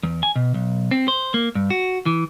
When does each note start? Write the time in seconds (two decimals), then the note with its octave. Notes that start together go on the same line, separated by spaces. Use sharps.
0.03 E2
0.23 G#5
0.36 B2
0.54 B1
0.91 C4
1.08 C5
1.34 A#3
1.55 G2
1.70 F#4
2.06 E3